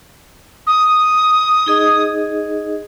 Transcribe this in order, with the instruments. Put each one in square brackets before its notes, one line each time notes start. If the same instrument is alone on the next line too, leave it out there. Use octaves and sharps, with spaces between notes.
[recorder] D#6
[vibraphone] D#4 G#4 D#5